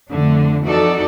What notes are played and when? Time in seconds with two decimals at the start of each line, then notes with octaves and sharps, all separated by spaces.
0.11 F2 D3 A3 D4
0.67 F2 E3 D#4 F#4 A4 D5